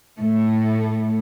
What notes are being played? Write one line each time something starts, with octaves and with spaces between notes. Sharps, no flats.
A2 A3